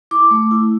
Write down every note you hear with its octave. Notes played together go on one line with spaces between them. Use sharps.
E4 D6
A3
E4